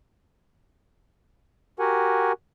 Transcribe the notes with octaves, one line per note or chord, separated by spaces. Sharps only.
F#4 G4 A#4 F#5 G#5